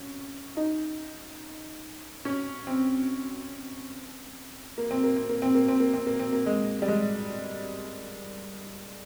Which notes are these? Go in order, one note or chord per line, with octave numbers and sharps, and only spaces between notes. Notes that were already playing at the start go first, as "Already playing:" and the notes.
Already playing: C#4
D#4
C#4
C4
A#3
C4
A#3
C4
A#3
C4
A#3
C4
A#3
C4
A#3
C4
A#3
G#3
G3
G#3